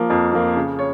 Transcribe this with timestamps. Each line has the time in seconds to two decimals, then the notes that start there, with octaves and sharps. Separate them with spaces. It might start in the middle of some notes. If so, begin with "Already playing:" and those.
Already playing: F3 A#3
0.10 F2
0.33 F3 A#3
0.56 C#3
0.79 C#5